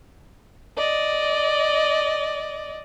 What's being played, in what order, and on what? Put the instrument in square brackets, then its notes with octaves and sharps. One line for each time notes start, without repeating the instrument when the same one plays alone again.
[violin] D5 D#5